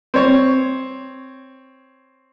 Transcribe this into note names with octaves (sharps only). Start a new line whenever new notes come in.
C4 C#5